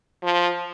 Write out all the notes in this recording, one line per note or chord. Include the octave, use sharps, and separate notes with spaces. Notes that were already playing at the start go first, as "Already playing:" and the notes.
F3